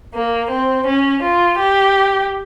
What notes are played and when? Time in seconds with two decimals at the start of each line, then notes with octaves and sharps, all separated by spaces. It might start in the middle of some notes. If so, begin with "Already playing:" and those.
0.14 A#3
0.50 C4
0.86 C#4
1.22 F4
1.57 G4